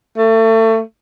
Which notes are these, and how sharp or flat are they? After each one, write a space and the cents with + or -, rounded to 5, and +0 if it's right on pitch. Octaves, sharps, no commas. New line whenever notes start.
A3 +30